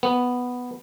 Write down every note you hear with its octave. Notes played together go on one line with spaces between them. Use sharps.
B3